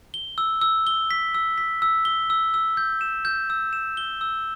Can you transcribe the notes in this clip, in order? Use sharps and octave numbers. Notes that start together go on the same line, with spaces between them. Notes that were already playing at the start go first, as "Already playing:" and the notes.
G7
E6
E6
G7
B6
E6
B6
E6
G7
E6
E6
G6
E7
G6
E6
E7
G7
E6